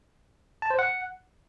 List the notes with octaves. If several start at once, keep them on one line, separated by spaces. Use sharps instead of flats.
A5
C5
F#5